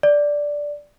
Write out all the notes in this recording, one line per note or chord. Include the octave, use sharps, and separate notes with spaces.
D5